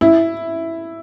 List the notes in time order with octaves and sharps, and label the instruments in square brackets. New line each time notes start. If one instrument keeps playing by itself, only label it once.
[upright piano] E4